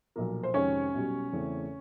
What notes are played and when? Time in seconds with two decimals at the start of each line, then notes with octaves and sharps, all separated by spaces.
0.16 B1 A#2 F3 A#3
0.43 C5
0.54 F2 C3 D#3 G#3 C4 C#4 C#5
0.94 B1 B2 G3
1.32 E2 C#3 E3 A3 C4